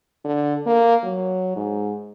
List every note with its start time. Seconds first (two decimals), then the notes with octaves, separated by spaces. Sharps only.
0.25 D3
0.66 A#3
1.03 F#3
1.56 G#2